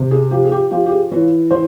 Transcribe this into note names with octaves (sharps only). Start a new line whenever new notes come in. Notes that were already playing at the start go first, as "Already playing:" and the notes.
Already playing: C3
G#4
F3 G4
G#4
G4
F3 G4
G4
G#4
E3 C#5
E3 C5